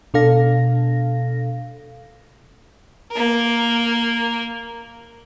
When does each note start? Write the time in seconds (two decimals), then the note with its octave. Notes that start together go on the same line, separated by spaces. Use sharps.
0.14 B2 D4 A4 F5 A#6
3.11 A#3 A#4